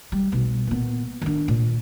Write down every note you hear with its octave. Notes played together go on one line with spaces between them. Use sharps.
G3
B1
A#2 B3
D#3 D4
A#2